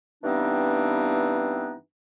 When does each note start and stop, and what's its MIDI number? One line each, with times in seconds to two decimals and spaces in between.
0.24 1.74 43
0.24 1.74 52
0.24 1.74 59
0.24 1.74 60
0.24 1.74 62
0.24 1.74 63